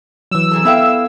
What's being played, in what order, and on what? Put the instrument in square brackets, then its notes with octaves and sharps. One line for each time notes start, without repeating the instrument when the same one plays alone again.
[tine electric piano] E3 F#3 [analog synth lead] E6
[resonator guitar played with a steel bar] C3 G#4 A4
[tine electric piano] B3 A4 F5 [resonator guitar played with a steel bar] E4 E5 G5